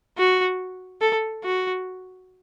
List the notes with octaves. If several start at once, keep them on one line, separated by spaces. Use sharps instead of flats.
F#4
A4
F#4